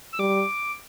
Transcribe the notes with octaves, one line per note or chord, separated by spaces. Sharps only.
E6
G3 D6